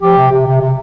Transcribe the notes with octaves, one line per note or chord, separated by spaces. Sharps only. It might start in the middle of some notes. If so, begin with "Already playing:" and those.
F3 G4
C3
C3
C3
C3